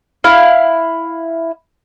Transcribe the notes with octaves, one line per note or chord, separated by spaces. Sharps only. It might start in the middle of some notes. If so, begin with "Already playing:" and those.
E4 F5